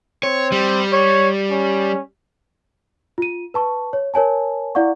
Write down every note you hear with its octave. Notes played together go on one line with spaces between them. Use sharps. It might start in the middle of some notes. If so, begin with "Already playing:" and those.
C4 C#5
G3
C#5
C#4
F4 D#7
B4 A5 C#6
C#5
A#4 C#5 G#5 A5
E4 D5 F5 F#5 C#6